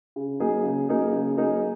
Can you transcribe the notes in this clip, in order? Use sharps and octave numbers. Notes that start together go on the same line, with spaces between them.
C#3
F#3 A#3 D#4 G#4
C#3
F#3 A#3 D#4 G#4
C#3
F#3 A#3 D#4 G#4